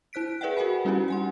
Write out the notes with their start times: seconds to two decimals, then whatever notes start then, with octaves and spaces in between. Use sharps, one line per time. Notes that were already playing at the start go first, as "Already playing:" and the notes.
0.13 E4 C5 F#6 B6 D7
0.41 G#4 B4 D5 E5 F#5 G5
0.57 F#4 A#4 F#5 G#5 B5
0.85 G3 C#4 D#4 E4 F#4 G4
1.08 F#5 G#5 C6